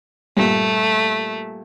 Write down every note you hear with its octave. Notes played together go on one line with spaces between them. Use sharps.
G2 A#2 A3